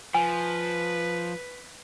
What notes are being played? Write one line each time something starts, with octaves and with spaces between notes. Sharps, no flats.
F3 B4 G#5